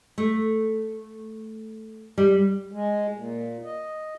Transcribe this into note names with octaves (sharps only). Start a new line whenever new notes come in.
A3
G3
G#3
A#2
D#5